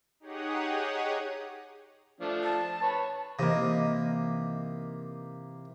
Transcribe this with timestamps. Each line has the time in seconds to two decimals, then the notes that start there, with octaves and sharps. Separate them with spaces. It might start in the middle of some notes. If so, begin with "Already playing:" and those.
0.20 D#4 G4 G#4 C#5 F#5 D#6
2.21 F3 A3 D4
2.43 A5
2.82 B4 C#5
3.39 C3 E3 A#3 D#4 D#5